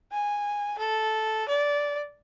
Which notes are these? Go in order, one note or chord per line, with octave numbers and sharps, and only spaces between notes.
G#5
A4
D5